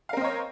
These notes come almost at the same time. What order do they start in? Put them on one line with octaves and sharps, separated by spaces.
F5 A#4 C4 D#5 C#5